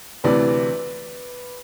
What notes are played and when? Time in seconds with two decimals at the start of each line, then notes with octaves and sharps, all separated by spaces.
0.24 D2 C3 E3 B4 D5